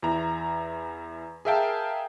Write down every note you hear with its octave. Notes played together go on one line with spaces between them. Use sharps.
E2 E4 A#5
G#4 A#4 E5 F5 G5 A5